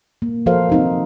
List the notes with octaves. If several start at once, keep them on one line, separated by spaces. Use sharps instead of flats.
A#3
F3 F#4 A4 A#4 C5 F5
C4 D#4 F#4